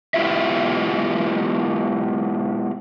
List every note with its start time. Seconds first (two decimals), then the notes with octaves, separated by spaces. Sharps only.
0.14 G#3 B3 E4 F4 G4 E5